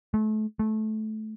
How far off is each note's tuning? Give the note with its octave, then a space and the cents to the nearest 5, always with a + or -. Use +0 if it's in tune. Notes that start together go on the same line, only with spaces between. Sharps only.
A3 -30
A3 -20